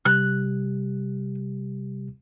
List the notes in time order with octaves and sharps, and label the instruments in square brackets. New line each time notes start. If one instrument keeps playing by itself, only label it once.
[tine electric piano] C3 G3 G4 [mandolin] F#6